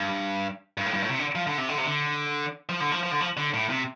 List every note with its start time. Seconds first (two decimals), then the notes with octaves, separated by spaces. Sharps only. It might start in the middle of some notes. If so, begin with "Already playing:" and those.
Already playing: G2
0.77 G2
0.86 A2
0.94 G2
1.02 A2
1.10 C3
1.19 D3
1.35 F3
1.47 D3
1.58 C3
1.69 D3
1.78 C3
1.86 D3
2.69 F3
2.80 D3
2.91 F3
3.03 F3
3.11 D3
3.20 F3
3.37 D3
3.54 A2
3.70 C3